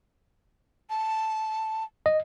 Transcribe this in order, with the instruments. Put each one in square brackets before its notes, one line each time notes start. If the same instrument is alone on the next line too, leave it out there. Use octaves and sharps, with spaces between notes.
[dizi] A5
[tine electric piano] D#5